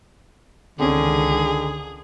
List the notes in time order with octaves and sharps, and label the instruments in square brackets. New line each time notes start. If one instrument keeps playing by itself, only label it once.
[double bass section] C#2 D#3 [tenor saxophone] D3 [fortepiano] C4 C#4 [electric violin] G#4